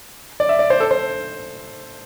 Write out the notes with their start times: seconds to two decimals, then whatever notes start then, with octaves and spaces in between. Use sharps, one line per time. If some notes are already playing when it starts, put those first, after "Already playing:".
0.40 D5
0.49 E5
0.59 D5
0.70 C5
0.80 A4
0.91 C5